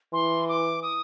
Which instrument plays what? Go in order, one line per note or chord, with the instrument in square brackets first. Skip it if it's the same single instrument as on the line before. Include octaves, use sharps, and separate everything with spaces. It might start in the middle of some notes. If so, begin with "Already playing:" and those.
[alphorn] E3 [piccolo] C6
[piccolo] D6
D#6